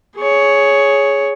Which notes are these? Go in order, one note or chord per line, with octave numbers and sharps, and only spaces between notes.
G#4 C#5